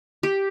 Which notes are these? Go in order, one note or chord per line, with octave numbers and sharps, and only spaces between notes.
G4